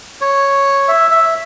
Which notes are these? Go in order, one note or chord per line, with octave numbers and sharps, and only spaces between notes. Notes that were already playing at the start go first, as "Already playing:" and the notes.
C#5
E5
E5